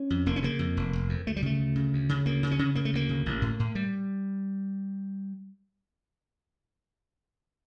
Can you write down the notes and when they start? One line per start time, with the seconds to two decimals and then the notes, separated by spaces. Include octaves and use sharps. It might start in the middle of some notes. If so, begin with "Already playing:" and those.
Already playing: C#4
0.10 F2
0.26 F1 A#3
0.36 C#4
0.43 C#3 A#3
0.59 F2
0.77 F1
0.93 F1
1.09 F2
1.27 D2 A3
1.36 G3
1.42 C#3 A3
1.59 D2
1.75 C#3
1.93 D2
2.09 C#3
2.26 D2 A#3
2.43 C#3
2.51 C#4
2.59 C#3
2.75 C#3 A#3
2.85 A3
2.93 D2 A#3
3.09 C#3
3.26 A1
3.42 A2
3.59 A2
3.75 G3